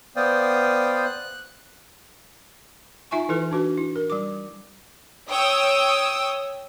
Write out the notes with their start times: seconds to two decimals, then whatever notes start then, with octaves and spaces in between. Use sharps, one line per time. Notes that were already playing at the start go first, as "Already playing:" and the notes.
0.16 B3 C5 D5 F5 G5 D#6
1.05 F#6
3.11 D#4 F4 E5 G#5 C#6
3.29 E3 E4 A4 B4
3.51 D4 F#4 B4
3.77 E4
3.96 A#4
4.10 G3 D6
5.30 C#5 G5 D#6 E6